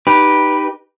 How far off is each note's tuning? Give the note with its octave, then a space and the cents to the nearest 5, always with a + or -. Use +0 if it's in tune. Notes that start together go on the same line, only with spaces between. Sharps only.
D#4 -10 G4 +0 B4 -5